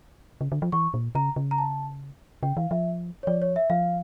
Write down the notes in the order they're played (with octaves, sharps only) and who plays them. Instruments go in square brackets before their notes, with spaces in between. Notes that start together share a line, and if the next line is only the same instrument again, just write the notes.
[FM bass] C#3
D3
F3
[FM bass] E3 [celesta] C#6
[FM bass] A#2
[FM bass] C#3 [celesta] A#5
[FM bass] C#3
[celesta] A#5
A5
[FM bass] C#3 [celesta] G5
[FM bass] E3 [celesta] F5
[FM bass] F3 [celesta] E5
[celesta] C#5
[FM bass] F3 [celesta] D5
[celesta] C#5
E5
[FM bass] F3 [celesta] F5